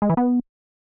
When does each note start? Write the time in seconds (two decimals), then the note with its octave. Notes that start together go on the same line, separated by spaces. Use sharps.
0.02 G#3
0.10 E3
0.17 B3